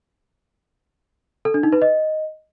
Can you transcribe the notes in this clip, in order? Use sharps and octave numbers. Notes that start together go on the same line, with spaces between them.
A4
D4
D#4
B4
D#5